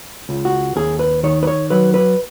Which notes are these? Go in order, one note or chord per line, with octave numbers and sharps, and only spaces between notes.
C#2
F#4
D#2 G#4
B4
D#3 C#5
B4
C#5
F#3 B4
B4